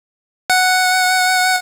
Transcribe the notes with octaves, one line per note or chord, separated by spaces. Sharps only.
F#5